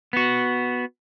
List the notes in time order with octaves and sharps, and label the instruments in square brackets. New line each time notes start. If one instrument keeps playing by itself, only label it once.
[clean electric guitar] B3 F#4